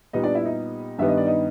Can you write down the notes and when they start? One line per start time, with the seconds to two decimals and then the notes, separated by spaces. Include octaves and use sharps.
0.13 A#2 G3 B3 D#4 D#5
0.23 D4 D5
0.34 E4 E5
0.45 D#4 D#5
0.99 G2 D#3 G3 B3 E5
1.08 D#5
1.17 D5
1.26 D#4 D#5